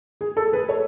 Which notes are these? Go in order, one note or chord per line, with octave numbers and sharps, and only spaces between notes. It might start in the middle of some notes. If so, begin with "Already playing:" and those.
G#4
A4
G#4 B4
A4 C#5